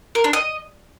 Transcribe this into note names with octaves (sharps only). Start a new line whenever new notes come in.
A#4
D4
D#5